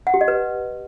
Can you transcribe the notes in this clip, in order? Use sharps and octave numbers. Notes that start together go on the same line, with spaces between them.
F#5
G4
D#5
B4